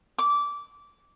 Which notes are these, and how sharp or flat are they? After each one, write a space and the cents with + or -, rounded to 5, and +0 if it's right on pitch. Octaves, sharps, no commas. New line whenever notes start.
D6 -20